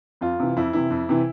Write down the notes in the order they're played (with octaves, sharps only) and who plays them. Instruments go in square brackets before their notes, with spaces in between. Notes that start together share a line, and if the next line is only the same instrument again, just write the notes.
[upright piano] F2 F4
C3 E3
F2 E4
C3 E3 E4
F2
C3 E3